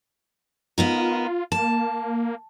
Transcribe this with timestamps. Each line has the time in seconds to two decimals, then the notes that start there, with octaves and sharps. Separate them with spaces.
0.78 B3 D#4 F4 A#4
1.52 A#3 A5